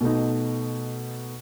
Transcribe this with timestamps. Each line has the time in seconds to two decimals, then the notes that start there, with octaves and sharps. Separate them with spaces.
0.01 B2 A3 D#4